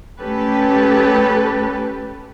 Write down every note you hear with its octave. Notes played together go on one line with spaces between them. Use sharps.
A3 C#4 G4 A4 B4